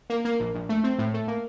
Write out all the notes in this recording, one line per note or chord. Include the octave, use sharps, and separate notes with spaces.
A#3
A#3
A#1
A#1
A3
C4
A2
A3
A#3